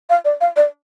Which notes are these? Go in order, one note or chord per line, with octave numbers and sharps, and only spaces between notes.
F5
D5
F5
D5